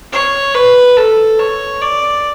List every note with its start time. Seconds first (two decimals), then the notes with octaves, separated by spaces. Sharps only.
0.12 C#5
0.54 B4
0.96 A4
1.39 C#5
1.81 D5